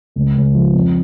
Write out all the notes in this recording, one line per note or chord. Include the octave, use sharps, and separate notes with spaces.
C#2
C#2
F3
F2